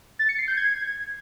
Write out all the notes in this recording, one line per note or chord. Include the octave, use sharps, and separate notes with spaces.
A6
C#7
C7
G6
G#6